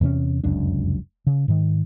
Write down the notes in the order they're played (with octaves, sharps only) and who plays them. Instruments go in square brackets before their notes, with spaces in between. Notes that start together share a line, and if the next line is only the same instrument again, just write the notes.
[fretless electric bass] E2 C3 A#3 C#4
F1 C#2 F#2 D4
C#3
G#2 D#3